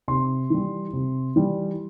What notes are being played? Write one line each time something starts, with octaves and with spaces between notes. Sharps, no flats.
C3 C6
E3 G3
C3
E3 G3